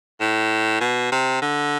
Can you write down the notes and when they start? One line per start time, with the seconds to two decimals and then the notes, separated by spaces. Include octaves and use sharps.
0.21 A2
0.81 B2
1.12 C3
1.42 D3